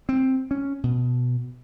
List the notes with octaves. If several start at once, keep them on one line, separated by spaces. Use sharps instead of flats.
C4
C#4
B2